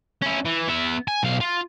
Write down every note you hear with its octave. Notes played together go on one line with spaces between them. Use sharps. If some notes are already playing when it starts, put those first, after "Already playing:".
C#4 E4
E3
B3 E5
G#5
B1 F5
F4